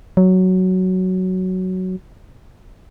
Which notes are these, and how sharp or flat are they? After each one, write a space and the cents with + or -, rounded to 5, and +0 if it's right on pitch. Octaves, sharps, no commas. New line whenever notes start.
F#3 +5